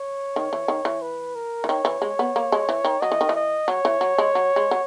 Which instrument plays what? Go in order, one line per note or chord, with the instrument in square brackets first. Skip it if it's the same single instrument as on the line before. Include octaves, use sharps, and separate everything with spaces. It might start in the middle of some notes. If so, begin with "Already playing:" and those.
Already playing: [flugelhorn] C#5
[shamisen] D#3
E3
D#3
E3
[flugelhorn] B4
A#4
[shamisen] E3
[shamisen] D#3 [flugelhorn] C#5
[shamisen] E3
G#3
B3
A#3
G#3
E3
D#3
[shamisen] F#3 [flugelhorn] D#5
[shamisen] E3
D#3
E3
[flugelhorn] D#5
[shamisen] F#3 [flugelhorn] C#5
[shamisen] E3
F#3
G#3
F#3
G#3
F#3